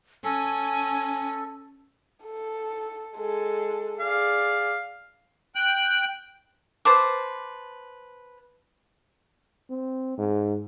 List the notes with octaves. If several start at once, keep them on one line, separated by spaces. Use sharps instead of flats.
C#4 A4 G#5
A4
G#3 A4
G#4 D5 F5
G5 F#6
B4 C5 A5 D6
C4
G#2